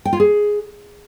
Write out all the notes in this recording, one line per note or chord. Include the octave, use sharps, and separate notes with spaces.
G5
F4
G#4